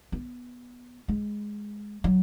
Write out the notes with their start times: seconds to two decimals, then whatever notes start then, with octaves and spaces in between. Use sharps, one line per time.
0.12 B3
1.08 G#3
2.04 F#3